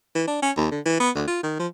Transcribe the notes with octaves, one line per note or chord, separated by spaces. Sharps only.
E3
D4
C#4
D#2
D3
E3
B3
D2
F4
D#3
F3